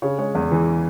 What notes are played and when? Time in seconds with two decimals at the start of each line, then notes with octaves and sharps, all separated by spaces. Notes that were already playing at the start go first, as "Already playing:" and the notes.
0.02 C#3 C#5
0.18 G#3 C#5
0.35 E2
0.52 E3